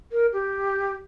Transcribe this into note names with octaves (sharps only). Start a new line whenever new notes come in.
A#4
G4